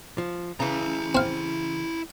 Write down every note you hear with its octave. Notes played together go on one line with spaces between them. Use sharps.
F3
C#3 E3 E4 A#5
C4 F5